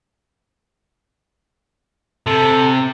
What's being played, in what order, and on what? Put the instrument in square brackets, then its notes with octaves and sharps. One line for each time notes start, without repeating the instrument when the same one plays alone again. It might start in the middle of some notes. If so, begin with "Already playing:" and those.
[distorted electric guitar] C3 [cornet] A4